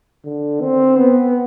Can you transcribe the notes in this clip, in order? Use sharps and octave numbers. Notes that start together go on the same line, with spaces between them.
D3
C4
B3